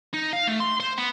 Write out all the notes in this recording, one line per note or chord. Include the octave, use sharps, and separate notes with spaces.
D#4
F5
A3
C6
C5
B3